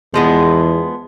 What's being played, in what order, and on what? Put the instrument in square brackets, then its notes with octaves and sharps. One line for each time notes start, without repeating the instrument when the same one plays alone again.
[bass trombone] E2 [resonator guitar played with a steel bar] F3 G#3 B3